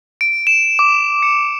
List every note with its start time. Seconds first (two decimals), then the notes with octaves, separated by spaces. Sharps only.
0.21 D7
0.47 E7
0.79 D6
1.23 C#7